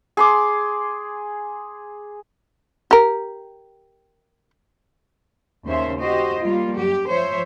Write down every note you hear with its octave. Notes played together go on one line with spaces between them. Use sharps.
G#4 C6 D6
G4 A#4
D#2 C#3 A#3 C#4 C5 E5
F#4 G4 C5 D#5
G3 A#3 F4
F#2 G4
F3 C5 C#5 E5